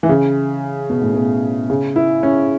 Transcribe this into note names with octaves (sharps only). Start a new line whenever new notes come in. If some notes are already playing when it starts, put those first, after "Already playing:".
E3
C#3
B2
A2
B2
C#3
E4
C#4